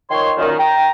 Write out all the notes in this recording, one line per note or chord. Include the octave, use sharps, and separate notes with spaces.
D#3 F3 C#5 C6
F#2 A#2 D#3
G5 A#5